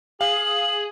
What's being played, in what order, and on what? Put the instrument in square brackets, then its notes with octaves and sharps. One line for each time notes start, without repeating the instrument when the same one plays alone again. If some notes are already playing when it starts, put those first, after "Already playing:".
[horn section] G#4 [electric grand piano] F5 [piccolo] F#7